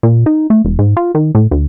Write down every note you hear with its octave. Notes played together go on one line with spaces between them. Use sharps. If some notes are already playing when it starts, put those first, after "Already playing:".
A#2
D#4
A3
E1
G#2
F4
D#3
A2
D2